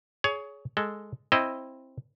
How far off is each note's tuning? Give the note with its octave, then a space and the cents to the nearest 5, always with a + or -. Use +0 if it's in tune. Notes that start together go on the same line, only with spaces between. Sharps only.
G#4 +20 C#5 +20
G#3 +0 A4 +0
C4 +10 E4 +0 D#5 +0